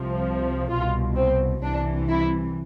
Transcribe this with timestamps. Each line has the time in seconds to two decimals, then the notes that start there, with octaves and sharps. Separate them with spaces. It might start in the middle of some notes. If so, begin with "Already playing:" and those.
Already playing: C2 C3 F3
0.71 C2 B2 F4
1.16 C4
1.62 C2 C3 E3 D4
2.08 E4